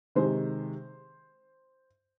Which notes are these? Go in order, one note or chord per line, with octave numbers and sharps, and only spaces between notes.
C3 D#3 G#3 C5